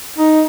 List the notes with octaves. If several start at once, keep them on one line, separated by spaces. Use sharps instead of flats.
D#4